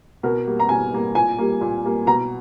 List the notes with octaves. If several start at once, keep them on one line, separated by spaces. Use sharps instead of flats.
B2 A#4
G3 A#3
A#5
B2 G#5
G3 A#3
A#2 G#5
G3 A#3
A#2
G3 A#3
B2 A#5